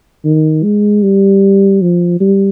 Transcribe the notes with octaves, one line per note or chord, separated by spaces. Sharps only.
D#3
G#3
G3
F3
G3